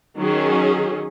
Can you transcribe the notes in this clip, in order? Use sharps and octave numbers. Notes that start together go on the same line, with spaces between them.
D#3 F#3 C#4 G#4